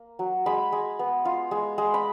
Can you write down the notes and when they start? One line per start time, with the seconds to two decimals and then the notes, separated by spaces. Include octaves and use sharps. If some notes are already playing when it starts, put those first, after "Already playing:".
Already playing: A#3
0.19 F#3
0.46 G#3 B5
0.72 G#3
0.99 B3
1.25 F4
1.51 G#3
1.78 G#3
1.94 B5